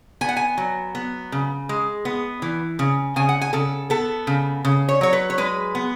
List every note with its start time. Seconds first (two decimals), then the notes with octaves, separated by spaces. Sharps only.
0.21 B3 G#5
0.29 F#5
0.36 G#5
0.57 F#3
0.95 B3
1.32 C#3
1.69 G#3
2.05 B3
2.42 E3
2.79 C#3
3.16 C#3 G#5
3.29 F#5
3.41 G#5
3.53 C#3 A4
3.90 B3 A4
4.27 C#3
4.65 C#3
4.89 C#5
5.01 F#3 C#5
5.13 B4
5.30 C#5
5.38 G#3 B4
5.75 B3